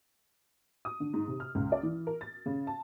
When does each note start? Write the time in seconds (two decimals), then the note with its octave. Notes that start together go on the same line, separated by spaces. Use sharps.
0.85 D#6
1.00 D3
1.13 G#2
1.28 C3
1.40 F6
1.55 C#2
1.72 D5
1.83 E3
2.07 A#4
2.21 A6
2.46 C#3
2.67 A5